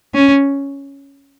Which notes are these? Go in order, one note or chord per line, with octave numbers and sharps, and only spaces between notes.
C#4